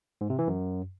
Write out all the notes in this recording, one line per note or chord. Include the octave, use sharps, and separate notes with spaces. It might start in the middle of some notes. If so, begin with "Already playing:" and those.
G#2
C3
E3
F#2